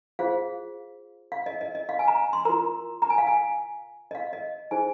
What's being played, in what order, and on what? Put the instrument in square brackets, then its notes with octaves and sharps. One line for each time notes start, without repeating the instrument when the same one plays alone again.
[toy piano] F4 G#4 C5 F5
F5
D#5
D#5
D#5
F5
G#5
A#5
C6
F4 A#4 A#5
A#5
G#5
F5
G#5
D#5
F5
D#5
D#4 G#4 C5 G#5